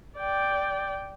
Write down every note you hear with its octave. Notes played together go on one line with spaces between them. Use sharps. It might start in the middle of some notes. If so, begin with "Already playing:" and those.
D5 G5